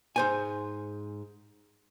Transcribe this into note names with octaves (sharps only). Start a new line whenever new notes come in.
G#2 C5 G#5